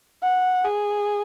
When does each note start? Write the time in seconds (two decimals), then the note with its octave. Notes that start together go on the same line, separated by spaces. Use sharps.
0.23 F#5
0.65 G#4